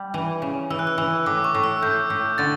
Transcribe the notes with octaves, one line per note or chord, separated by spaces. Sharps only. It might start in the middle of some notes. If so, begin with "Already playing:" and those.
Already playing: G3
E3
C#3
E3 E6
F#6
E6
E3 E6
A2 D6
C#6
A2
E6
A2 G6
A2
D3 A6